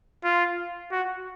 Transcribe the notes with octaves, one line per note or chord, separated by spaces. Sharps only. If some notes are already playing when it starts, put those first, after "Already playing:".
F4
F#4